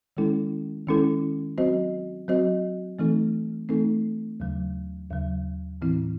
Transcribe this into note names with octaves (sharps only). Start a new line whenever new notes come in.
D#3 G#3 C#4 E4 A4
D#3 G#3 C#4 E4 A4
F#3 C4 F#4 C5 D#5
F#3 C4 F#4 C5 D#5
E3 A3 C4 D#4 A4
E3 A3 C4 D#4 A4
D#2 C#3 F#3
D#2 C#3 F#3
A2 E3 C4 E4